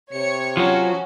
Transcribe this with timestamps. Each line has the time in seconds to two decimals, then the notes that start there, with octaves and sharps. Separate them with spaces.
0.13 C3 C#5 C#7
0.57 F3 F#3 C#4 F#4